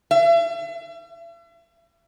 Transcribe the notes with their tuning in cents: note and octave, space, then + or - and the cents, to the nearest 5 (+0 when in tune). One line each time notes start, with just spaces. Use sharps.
E5 +40